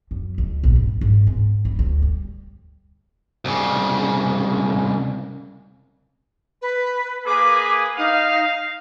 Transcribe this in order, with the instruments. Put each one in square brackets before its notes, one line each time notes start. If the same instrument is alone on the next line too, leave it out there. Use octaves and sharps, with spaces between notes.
[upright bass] F#2
C#2
A#1
G2
G#1
G#2
G3
D2
G3
[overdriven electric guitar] C2 C#3
[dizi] B4
[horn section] A#3 G#4 B4 [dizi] D6
[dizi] D#4 [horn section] F5